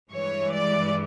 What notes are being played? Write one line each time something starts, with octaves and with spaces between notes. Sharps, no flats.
G2 E3 G#3 C#5
D5